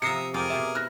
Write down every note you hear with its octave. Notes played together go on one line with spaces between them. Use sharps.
C3 F3 E5 A#5 D#6 A#6 C7 C#7
F2 F4 G#4 A#4 F5 G5 D6
B2 C5 E5 A5
E4 F6 F#6 A#6